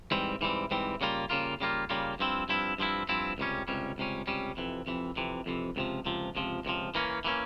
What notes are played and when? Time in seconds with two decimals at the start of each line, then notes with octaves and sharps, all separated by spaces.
0.11 G#2 E3 G3 C4
0.41 G#2 E3 G3 C4
0.71 G#2 E3 G3 C4
1.01 C#3 G3 A#3 F4
1.30 C#3 G3 A#3 F4
1.60 C#3 G3 A#3 F4
1.90 C#3 G3 A#3 F4
2.19 G2 F3 C4 E4
2.49 G2 F3 C4 E4
2.78 G2 F3 C4 E4
3.09 G2 F3 C4 E4
3.38 C#2 C3 G3 C#4
3.68 C#2 C3 G3 C#4
3.98 C#2 C3 G3 C#4
4.27 C#2 C3 G3 C#4
4.57 F2 C3 E3
4.87 F2 C3 E3
5.16 F2 C3 E3
5.46 F2 C3 E3
5.76 C#2 C3 F3
6.06 C#2 C3 F3
6.35 C#2 C3 F3
6.65 C#2 C3 F3
6.95 E3 A#3 C#4
7.24 E3 A#3 C#4